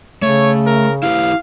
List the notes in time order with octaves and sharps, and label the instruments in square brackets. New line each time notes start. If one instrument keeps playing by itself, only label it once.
[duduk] C#3 [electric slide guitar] A3 [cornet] C#5
[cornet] A#4
[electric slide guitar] E4 G4 B4 [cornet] F5